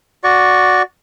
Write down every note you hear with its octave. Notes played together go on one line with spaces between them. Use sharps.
F#4 D5 C#6